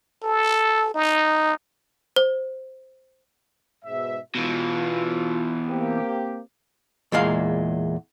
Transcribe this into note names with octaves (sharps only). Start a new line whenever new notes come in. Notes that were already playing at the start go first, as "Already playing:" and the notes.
A4
D#4
C5
G#2 B2 E5
B2 E3 F4
A#3 C4 G4
E2 A#2 G#3 F5